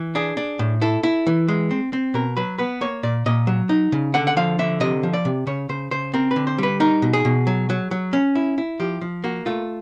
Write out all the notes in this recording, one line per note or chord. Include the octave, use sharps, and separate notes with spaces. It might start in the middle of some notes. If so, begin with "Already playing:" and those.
Already playing: E3
D4 G#4
D4
A2
E4 A4
E4
E3
G#3
C4
C4
B2 A#4
F#3 B4
B3 B4
A#3 C#5
A#2 D5
A#2 D#5
F#3
D#4
C#3
D3 F#5
F#5
F3 F5
D3 E5
C3 D#5
F3
D5
C3
C#3 C#5
C#3 C5
C#3 C5
C4 A#4
B4
D3
C5
G3 B4
D#4 A#4
B2
G#4
B2
F#3
F#3
F#3
C#4
E4
E4
F3 G4
F3
A#3 F#4
A3 F4